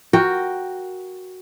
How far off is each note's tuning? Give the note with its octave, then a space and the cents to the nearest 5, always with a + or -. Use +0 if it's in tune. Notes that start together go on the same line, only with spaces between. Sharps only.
F#4 +0 A#4 +0 G5 +0